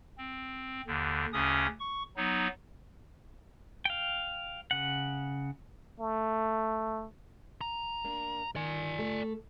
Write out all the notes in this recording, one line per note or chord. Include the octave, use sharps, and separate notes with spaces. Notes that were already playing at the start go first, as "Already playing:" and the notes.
C4
D#2 D3
D2 C#3 C#4 D#6
C#6
F#3 B3 D#4
F5 G5
C#3 F#5
A3
A#5
A#3 D4
D#3 D5 G#5
A3 A4